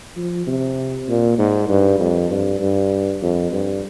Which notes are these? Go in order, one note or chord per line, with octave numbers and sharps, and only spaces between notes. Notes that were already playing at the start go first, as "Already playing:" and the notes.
F3
C3
A#2
G#2
G2
F2
G2
G2
F2
G2